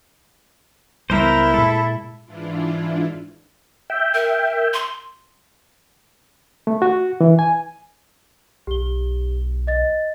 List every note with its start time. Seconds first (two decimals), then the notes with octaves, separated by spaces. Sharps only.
1.10 C#2 G3 B3 E4 A#4 C5
1.54 A#2 G#3 A4
2.26 G#2 E3 D4 E4 F4
3.90 E5 G5
4.14 A#4
4.74 C6
6.67 A3
6.82 F#4
7.21 E3
7.39 G#5
8.67 B1 G4 G7
9.67 D#5 A6